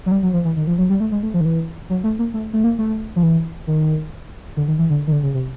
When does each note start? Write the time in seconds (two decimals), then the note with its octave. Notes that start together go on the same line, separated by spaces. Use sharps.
0.06 F#3
0.11 G3
0.23 F#3
0.33 F3
0.45 E3
0.56 D#3
0.67 F3
0.78 F#3
0.90 G3
1.00 A3
1.12 G#3
1.23 A3
1.34 F3
1.41 D#3
1.45 E3
1.90 F#3
2.04 A3
2.19 A#3
2.34 A3
2.53 A3
2.64 A#3
2.79 A3
3.16 F3
3.23 E3
3.67 D#3
4.57 D3
4.68 D#3
4.78 E3
4.90 D3
5.07 D#3
5.12 D3
5.23 C#3
5.34 C3